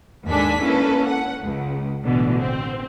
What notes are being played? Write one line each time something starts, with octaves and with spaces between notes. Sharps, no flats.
D#2 G#2 D4 A4 G#5 B6
A#3 C#4 E4 A4 B4
F#5
C#2
A1 B2 D3 E3
C4